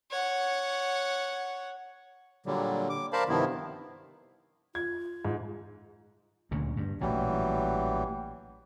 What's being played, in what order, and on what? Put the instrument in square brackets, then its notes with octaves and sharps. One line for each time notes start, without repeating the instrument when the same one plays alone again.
[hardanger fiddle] C#5 F#5
[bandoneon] A#2 D3 F#3 G3
D6
A#4 C5 D5 F5 A5 B5
G2 C3 D#3 F3 B3 E4
[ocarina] F4 [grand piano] G#6
[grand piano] G#2
[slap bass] D2 A#2 C#3
G2
[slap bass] A1 A#2 [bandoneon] E3 F#3 G3